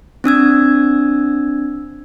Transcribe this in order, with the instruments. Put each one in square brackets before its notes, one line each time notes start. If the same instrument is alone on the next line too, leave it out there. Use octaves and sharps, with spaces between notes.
[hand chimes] C4 D4 E6 G#6